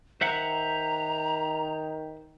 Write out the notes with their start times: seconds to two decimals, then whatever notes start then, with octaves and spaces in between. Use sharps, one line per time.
0.21 D#3 C5 E5 F#5 A#5